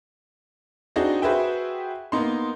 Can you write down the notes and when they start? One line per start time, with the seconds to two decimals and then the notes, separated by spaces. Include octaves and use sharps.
0.96 C4 D4 D#4 F#4 G#4 D#5
1.22 F#4 G#4 B4 C5 E5 G5
2.12 A#3 B3 D#4 C6